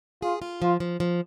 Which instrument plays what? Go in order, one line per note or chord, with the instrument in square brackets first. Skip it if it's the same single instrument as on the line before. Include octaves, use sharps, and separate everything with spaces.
[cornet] F4 [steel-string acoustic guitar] G#4
[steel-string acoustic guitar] F4
[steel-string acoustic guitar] F3 [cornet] F4
[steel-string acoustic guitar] F3
F3